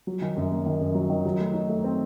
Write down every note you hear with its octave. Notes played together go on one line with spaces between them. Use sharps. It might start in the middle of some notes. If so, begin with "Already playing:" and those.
F#3
D#3
F#2
A#3
D#3
F#2
F#3
D#3
F#3
A3
D#4
A3
C4